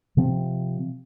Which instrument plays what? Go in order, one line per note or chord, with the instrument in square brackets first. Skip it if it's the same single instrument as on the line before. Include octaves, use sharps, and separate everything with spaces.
[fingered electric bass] C3 F3 C4